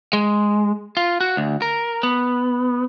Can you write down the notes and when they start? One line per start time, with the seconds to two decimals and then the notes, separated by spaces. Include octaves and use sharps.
0.13 G#3
0.97 F4
1.21 F#4
1.37 D2
1.62 A#4
2.03 B3